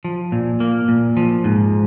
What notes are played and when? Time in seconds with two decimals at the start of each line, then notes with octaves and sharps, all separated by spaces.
0.05 F3
0.32 A#2
0.60 A#3
0.88 A#2
1.17 F3
1.44 G#2